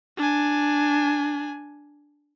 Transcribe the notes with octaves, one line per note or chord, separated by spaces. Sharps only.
D4 G#5